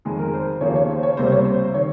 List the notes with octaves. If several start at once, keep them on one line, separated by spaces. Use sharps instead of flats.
F2 D#3 G#3 G#4
A#4
C5
D#2 C#3 F3 A#3 C#5
C#5
C5
C#5
C#2 C3 G3 A#3 C5
C#5
C5
D#3 C#5